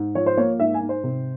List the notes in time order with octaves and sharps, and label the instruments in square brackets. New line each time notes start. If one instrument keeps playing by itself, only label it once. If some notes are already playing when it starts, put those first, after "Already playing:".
Already playing: [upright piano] G#2
F3 C#5
C5
A#3 C#5
G#2 E5
G#5
G#2
C5
C3